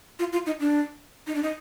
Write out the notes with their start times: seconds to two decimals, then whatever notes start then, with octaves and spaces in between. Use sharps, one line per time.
0.19 F4
0.33 F4
0.46 D#4
0.60 D4
1.27 D#4
1.35 D4
1.43 D#4